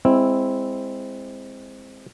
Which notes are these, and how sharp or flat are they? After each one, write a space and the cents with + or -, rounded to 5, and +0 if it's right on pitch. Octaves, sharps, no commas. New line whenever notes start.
G#3 -20 C4 +0 E4 +0